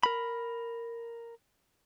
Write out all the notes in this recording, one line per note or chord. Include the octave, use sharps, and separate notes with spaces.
A#4 B5